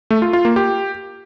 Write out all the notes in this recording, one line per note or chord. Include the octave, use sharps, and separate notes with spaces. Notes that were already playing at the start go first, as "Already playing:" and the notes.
A3
F4
F4
A#3
G4